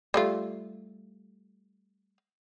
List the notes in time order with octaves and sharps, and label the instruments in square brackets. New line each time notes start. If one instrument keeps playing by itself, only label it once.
[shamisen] G3 A3 F4